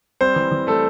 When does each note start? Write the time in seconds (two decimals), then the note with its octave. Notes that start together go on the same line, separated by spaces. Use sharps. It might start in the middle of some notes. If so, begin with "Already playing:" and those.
0.21 G3 C4 C5
0.36 E3
0.52 E3
0.67 G3 A3 A4